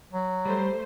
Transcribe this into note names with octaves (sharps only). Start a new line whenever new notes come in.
F#3
G3 A3 C5